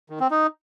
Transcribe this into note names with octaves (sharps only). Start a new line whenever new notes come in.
D#3
C4
D#4